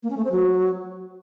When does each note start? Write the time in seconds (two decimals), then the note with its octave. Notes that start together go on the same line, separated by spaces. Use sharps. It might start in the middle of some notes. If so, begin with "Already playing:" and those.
0.03 A#3
0.10 C#4
0.17 A3
0.24 C4
0.31 F#3